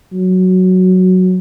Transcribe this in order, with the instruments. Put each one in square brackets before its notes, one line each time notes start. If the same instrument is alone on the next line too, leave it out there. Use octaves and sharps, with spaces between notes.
[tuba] F#3